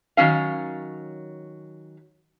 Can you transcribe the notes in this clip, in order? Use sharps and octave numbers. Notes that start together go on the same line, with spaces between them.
D#3 F#3 C#4 F5